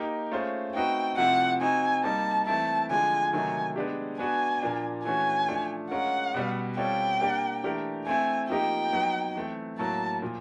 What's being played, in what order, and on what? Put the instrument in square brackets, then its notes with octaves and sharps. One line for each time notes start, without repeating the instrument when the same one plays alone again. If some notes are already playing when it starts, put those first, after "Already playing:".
Already playing: [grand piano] A#3 D#4 G4 A#4
A3 C#4 F4 G#4 C5
[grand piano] A3 C4 D#4 F#4 B4 [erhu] G5
[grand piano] C3 F3 A3 C4 E4 [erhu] F#5
[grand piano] C4 D#4 F#4 [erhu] G#5
[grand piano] G3 A#3 D#4 [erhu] A5
[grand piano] E3 A3 C4 E4 [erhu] A5
[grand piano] D3 F3 G#3 [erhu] G#5
[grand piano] C3 D#3 F#3 A3 [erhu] G#5
[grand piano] G#3 B3 D4 G4
[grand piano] B3 D4 F#4 B4 [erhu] G#5
[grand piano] A#2 F3 A#3 D4
[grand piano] E3 A3 C#4 F#4 [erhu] G#5
[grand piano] F3 A3 D4
[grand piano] G#3 C#4 F4 A#4 [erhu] F#5
[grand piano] B2 G3 B3
[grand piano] G3 C4 F4 A4 C#5 [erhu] G5
[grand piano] A#3 D4 G4 A#4 D5
E3 A3 D4 G4 A#4
[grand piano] A3 C4 E4 [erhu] G#5
[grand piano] F3 A#3 D#4 G4 [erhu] G5
[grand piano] F#3 B3 D#4
E3 A3 C4
[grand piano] A2 F#3 A#3 [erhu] A5
[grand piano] A#2 F3